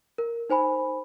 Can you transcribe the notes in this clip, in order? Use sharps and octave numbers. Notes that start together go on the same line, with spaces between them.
A#4
D#4 C5 G#5 B5